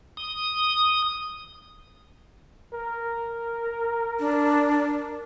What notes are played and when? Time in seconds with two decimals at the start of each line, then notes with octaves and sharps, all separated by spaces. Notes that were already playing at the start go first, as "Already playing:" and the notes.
0.17 D#6
2.73 A#4
4.20 D4